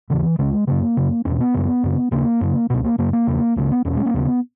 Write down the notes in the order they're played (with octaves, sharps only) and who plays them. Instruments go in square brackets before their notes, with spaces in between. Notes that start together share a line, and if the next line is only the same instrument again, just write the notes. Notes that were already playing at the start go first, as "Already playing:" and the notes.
[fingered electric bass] D#2 C#3 E3
C#2 C#3 G#3
F#2 C#3 A#3
F#2 C#3
E2 B2 C#4
B3
F#2 C#3
F#2 C#3
D#2 C#3 A#3
F#2 C#3
C#2 B2 B3
A#3
F#2 C#3 A#3
A#3
E2 C#3
C#2 C#3 A#3
B3
E2 B2 C#4
G#3
A#3
D#2 C#3 B3